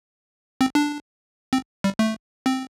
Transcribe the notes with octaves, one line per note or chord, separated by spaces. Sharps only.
C4
D4
C4
G3
A3
C4